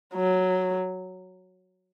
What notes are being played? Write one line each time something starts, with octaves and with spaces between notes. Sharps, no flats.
F#3